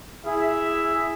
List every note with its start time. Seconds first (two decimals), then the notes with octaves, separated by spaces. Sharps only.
0.25 E4 G#4 E5